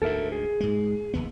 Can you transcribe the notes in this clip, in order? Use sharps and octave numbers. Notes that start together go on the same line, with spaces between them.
D2 G#2 A4 A#4 E5
G#4
G#2 G#3
F1 D#2 B3